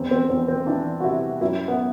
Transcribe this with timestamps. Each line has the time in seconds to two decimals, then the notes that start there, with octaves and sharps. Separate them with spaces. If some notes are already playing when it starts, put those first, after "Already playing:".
Already playing: E2 C4
0.11 C4
0.30 E2 C4
0.48 C4
0.67 E3 D4
1.00 F#4
1.04 C3 E4
1.41 F#2 E4
1.68 B3